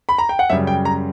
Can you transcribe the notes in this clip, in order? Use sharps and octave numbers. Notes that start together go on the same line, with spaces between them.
B5
A#5
G5
F#5
F#2 C#3 G3 E5
G5
A#5